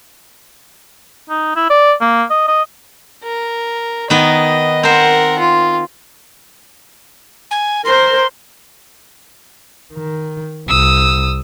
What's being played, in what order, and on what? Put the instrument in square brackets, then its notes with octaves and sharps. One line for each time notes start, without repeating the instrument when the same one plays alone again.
[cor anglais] D#4
E4
D5
A#3
D#5
D#5
[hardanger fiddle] A#4
[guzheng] D#3 B3 [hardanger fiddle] D#5
[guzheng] C4 C5 [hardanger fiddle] A#4 F#5
[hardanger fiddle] F4
[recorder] G#5
[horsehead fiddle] A#4 C5 [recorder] C6
[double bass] D#3
[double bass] C2 [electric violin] D#6 E6